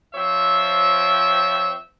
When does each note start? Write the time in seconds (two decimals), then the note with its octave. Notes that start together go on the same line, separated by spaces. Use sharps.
0.15 F3 C4 C#5 E5